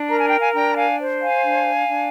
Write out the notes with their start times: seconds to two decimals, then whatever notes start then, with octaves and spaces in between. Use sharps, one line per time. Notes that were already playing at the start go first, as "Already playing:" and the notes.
Already playing: D4
0.09 A#4 A#5
0.19 G#5
0.28 G5
0.39 F5 G#5
0.53 D4 G5 A#5
0.75 F5 G#5
0.99 C5
1.21 F5 G#5
1.43 D4
1.89 D4